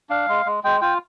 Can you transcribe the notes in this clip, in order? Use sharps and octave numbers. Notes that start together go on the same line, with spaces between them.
D4 F5
G#3
G#3
G#3 G5
F4 G5